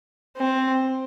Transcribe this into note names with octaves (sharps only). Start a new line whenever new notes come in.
C4